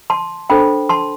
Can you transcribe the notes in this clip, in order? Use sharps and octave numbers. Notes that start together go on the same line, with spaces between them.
A5 C6
D4 A4 C5 G5 B5
A5 C6